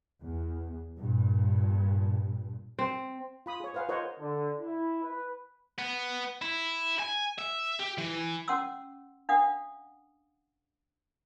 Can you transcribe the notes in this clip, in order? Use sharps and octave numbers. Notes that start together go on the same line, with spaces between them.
E2
G2 A#2
C4
F4 B5 D#6
G#4 C#5
B4 C5 F5 F#5 G#5
F4 A#4 C5 C#5 D#5 F#5
D3
E4
B4
B3
E4
G#5
E5
G4
E3
C#4 F#5 C6 D6 E6
D4 F5 F#5 D#6